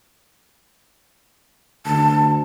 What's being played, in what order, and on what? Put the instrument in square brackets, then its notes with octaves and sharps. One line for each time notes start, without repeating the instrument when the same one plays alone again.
[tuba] D2 [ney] A5